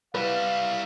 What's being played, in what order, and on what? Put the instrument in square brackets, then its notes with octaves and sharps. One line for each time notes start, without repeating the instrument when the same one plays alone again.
[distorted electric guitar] G3 E4 [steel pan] B4 [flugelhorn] F5